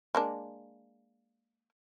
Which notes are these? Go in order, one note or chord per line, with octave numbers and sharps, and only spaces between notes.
G#3 A#3 D4